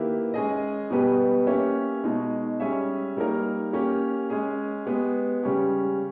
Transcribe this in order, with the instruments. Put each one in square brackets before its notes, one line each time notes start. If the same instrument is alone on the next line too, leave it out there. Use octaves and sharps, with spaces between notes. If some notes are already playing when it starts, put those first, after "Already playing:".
Already playing: [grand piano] D#3 A#3 E4 G4 B4
G#3 C#4 G#4 D#5
B2 G3 B3 G4 B4
A#3 C#4 G4 C#5 E5
B2 G#3 D#4
G3 C#4 G#4 C#5 E5
G3 A#3 D#4 A#4
A#3 C#4 G4
G#3 C#4 G#4
G#3 B3 G4
C#3 G3 C#4 G4